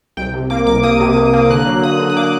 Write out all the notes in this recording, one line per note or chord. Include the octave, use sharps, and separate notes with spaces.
C2 G5
C3
A#3 D6
C2 D6
A#3 D#6
C3
C3
A#3
D3 F#6
F#3
A#3 D#6
D3
D#6
A#3 D6